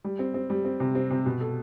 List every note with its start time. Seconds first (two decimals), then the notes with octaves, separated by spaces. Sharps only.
0.04 G3
0.19 C4
0.34 C4
0.50 G3
0.65 C4
0.80 C3
0.95 C4
1.11 C3
1.26 B2
1.41 A4